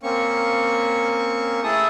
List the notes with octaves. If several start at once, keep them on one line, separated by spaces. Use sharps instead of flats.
A#3 C4 C#4 C#6
A3 E4 G#4 A4 A5 D#6